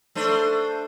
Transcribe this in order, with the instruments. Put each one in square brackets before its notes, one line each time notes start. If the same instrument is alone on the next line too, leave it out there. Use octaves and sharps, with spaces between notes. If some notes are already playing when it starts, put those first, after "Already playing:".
[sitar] A3 D4 C5